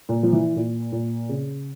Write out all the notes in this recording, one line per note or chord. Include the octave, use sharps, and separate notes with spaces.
A#2
F3
E3
A#2
A#2
C#3